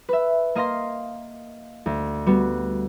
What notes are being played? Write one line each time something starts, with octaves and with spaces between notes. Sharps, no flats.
B4 E5
A#3 D#5 F5 C6 A#6
D2
G3 B3 F#4